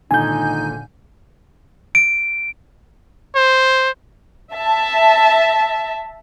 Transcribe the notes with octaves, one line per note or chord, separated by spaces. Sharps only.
G#1 A#2 D3 D#4 G#5 G6
D7
C5
E5 A5